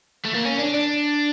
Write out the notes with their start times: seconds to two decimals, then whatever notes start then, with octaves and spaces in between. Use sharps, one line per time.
0.25 A3
0.34 A#3
0.45 C#4
0.59 D4
0.74 D4